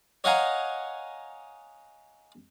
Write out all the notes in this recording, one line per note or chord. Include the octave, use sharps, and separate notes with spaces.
C#5 D#5 F5 F#5 G#5 A#5